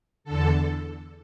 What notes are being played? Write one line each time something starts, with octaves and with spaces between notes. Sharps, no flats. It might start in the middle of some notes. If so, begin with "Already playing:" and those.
E2 D3 A4